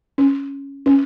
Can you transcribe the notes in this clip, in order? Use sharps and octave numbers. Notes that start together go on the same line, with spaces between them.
C#4
C#4